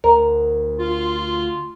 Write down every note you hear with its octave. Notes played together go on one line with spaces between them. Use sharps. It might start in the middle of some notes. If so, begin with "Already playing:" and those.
D2 A#4
F4